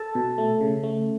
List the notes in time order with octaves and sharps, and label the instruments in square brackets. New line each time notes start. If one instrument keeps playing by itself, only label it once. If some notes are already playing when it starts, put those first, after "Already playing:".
Already playing: [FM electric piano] A4 A5
B2
A3
C#3
A3